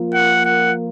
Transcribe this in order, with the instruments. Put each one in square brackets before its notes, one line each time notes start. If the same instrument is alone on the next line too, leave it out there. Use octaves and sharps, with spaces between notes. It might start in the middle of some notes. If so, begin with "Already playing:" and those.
Already playing: [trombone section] F3 A#3 F4 A#4
[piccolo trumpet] F#5
F#5